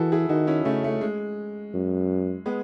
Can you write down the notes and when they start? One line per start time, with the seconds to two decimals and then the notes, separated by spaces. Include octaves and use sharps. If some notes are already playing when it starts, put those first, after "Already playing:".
Already playing: E3 E4 F#4 G#4 A4
0.12 E4 G#4
0.29 D#3 D#4 F#4
0.47 C#4 E4
0.65 C#3 A3 C#4
0.84 A3
1.01 G#3
1.74 F#2
2.46 G#3 B3